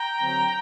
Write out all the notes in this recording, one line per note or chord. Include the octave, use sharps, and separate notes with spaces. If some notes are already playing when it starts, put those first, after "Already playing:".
Already playing: G5 A#5
D3 F#3 C4